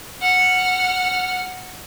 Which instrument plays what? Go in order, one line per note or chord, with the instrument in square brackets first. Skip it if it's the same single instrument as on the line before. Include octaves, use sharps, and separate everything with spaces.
[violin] F#5 F6